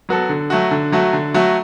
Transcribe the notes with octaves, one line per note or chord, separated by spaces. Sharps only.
F#3 B3 F#4 A4
D3
F#3 A3 F#4
D3
F#3 A3 F#4
D3
F#3 A3 F#4